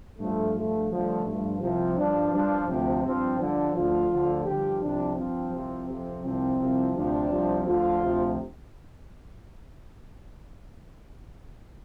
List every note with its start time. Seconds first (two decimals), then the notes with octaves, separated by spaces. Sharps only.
0.19 G2 F3 A3
0.54 G2 F3 A3
0.90 G2 D3 F3 A3
1.26 G2 F3
1.61 C2 C3 F3
1.96 G2 F3 D4
2.32 G2 F3 D4
2.67 D2 C3 F3 C4
3.03 G2 F3 C4
3.39 G2 D3 F3 D4
3.75 D2 D3 F3 F4
4.10 D2 D3 F3
4.45 G2 D3 F3 G4
4.81 C2 C3 F3 D4
5.16 G2 F3 C4
5.52 C2 C3 F3
5.88 F2 C3 F3
6.23 C2 C3 F3 C4
6.60 C2 C3 F3
6.95 D2 C3 F3 D4
7.30 C2 C3 F3
7.65 D2 D3 F3 F4
8.01 D2 C3 F3